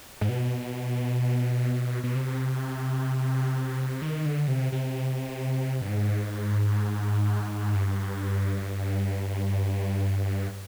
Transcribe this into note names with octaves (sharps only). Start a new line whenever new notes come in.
G#2
B2
B2
C3
D#3
D3
C3
C3
G2
G#2
G2